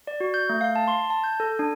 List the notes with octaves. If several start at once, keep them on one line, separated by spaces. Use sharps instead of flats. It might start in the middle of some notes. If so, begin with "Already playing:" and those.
D5
F#4
G6
A3
F5
A5
C6
A5
G6
A4
D4